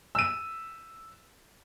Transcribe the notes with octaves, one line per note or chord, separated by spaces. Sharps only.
E6 D#7